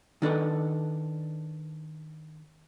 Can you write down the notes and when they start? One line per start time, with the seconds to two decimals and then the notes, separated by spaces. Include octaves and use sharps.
0.22 D#3 D4 A4 B4